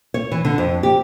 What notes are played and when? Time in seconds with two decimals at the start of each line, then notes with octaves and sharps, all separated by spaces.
0.14 C#5
0.31 E3
0.45 D3
0.58 F2
0.83 G4